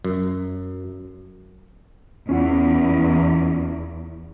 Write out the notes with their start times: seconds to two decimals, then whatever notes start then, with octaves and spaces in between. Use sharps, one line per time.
0.05 F#2
2.29 E2 C#4 F4 F#5